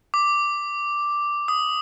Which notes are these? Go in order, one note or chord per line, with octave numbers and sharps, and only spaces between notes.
D6
D#6